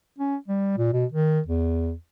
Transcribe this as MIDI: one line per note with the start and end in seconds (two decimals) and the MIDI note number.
0.19 0.36 61
0.48 0.77 55
0.78 0.91 46
0.93 1.05 47
1.12 1.40 51
1.46 1.93 40